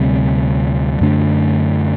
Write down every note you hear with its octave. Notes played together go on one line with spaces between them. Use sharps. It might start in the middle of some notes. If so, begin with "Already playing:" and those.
Already playing: D2 C3 G3 C4
F#2 D3 A3 D4